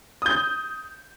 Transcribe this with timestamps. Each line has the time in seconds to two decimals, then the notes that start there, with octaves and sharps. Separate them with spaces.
0.22 D#6 G6